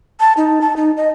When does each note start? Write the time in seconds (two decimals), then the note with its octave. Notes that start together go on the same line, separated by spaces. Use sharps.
0.20 A5
0.37 D#4
0.61 A5
0.76 D#4
0.97 D#5